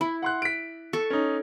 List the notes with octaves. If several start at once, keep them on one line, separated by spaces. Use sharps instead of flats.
E4 B5
F#5 C6 F#6
B6 D7
A4 C#6
C#4 D#4